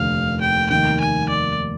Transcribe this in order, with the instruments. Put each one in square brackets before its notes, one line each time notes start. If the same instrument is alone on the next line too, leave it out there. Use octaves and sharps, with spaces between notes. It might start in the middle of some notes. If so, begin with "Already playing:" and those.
Already playing: [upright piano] F1 D#2 D3 [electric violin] F5
[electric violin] G5
[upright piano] F1 D#2 D#3 [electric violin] G5
[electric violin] G#5
D5